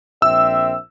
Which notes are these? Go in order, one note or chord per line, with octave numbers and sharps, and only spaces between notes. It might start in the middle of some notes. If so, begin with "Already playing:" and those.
A#1 C4 E5 E6